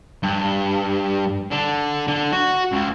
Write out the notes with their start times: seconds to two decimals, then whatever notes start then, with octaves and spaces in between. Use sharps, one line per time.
0.23 G2
1.51 D3
2.08 D3
2.32 F#4
2.72 C#2